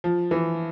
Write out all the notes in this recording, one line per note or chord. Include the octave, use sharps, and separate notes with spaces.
F3
E3